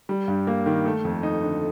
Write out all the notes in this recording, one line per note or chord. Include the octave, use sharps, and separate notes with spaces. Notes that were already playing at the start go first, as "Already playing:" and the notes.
G3
G2
A#3
D#3
A3
F2
D#4
D3